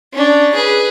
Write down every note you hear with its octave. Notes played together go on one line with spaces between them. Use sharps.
C#4 D4
G#4 B4